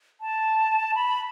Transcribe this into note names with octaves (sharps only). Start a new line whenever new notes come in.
A5
B5